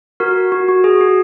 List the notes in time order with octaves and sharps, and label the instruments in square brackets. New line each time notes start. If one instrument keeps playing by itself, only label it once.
[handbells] F#4 A#4
F#4
F#4
G#4
F#4